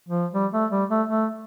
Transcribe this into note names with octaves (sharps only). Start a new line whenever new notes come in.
F3
G3
A3
G3
A3
A3